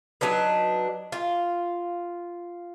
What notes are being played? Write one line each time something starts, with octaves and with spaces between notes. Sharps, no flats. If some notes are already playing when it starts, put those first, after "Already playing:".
F#3 D4 D#4 B4
F4